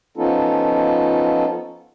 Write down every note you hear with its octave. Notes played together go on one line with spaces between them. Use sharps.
F3 B3 C#4 D#4 F4 A4